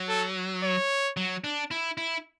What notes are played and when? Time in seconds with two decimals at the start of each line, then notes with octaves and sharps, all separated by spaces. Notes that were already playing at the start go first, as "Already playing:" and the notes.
Already playing: F#3
0.09 A4
0.63 C#5
1.17 F#3
1.44 D4
1.71 E4
1.98 E4